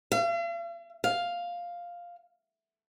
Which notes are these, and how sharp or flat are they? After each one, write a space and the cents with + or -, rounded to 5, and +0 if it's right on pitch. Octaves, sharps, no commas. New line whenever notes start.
F5 -45
F5 +5